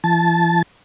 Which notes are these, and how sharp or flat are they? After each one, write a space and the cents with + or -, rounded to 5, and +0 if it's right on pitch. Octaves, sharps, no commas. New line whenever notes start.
E3 +45 A5 -15